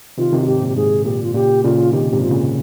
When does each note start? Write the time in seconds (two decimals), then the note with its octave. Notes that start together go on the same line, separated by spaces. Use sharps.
0.18 C3 D#3 F4
0.33 C3 D#3
0.41 F4
0.47 G#2 G4
0.62 A#2
0.68 G4
0.76 G#2 G#4
1.05 A#2 G4
1.23 F4
1.34 A#2 C#3 G4
1.64 A#2 C#3 F4
1.93 C3 D#3 G4
2.11 G#2 C3 G4
2.22 F4
2.31 A#2 C#3